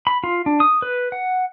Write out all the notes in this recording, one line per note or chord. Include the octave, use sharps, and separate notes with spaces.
B5
F4
D4
D#6
B4
F#5